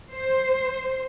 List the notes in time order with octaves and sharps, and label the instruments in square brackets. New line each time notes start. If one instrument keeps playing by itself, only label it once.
[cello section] C5